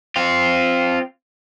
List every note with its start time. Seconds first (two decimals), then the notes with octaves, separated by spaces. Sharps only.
0.16 C4 F4